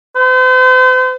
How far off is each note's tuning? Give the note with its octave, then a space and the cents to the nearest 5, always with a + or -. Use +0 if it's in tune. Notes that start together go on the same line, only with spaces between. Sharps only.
C5 -40